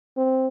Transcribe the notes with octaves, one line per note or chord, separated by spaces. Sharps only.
C4